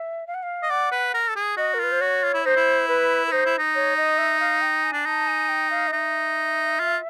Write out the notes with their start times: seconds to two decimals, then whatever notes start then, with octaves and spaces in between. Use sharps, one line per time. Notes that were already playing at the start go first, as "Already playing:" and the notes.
Already playing: E5
0.27 F5
0.34 F#5
0.43 F5
0.63 D#5
0.70 D5 F#5
0.92 B4
1.14 A#4
1.29 A4
1.36 G#4
1.57 F#4 D#5
1.74 A#4
1.79 F4 B4
1.92 C5
2.00 F#4 C#5
2.23 F4
2.34 E4
2.45 D#4 C5
2.56 E4
2.88 B4
3.27 B4
3.31 D#4 C5
3.46 E4
3.58 D#4
3.75 C#5
3.96 D#5
4.18 E5
4.40 F5
4.61 G5
4.83 G#5
4.93 D4
5.05 D#4 A5
5.27 G#5
5.49 G5
5.70 F5
5.87 D#5
5.92 D#4 E5
6.80 F4